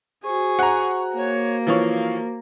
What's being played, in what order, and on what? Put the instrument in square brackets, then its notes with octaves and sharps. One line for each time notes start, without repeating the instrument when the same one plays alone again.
[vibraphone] F#4 C5 [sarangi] G#4 [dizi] C#6
[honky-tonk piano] F#5 A#5
[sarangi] A#3 [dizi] C#5
[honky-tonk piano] E3 F3 C#5 [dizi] F5